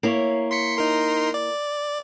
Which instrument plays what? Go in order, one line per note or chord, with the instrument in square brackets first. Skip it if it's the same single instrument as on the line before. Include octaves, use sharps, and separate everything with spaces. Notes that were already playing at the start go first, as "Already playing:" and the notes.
[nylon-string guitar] A#3 E4 C#5
[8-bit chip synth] C6 B6 C#7
D#4 A#4 C6
D5